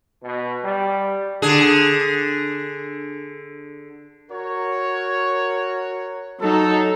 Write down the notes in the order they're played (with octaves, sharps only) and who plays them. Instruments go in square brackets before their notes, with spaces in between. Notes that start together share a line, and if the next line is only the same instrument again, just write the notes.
[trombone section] B2
G3
[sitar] D3 G#4
[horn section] F#4 A#4 C#5
[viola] F#3 D#4 [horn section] A4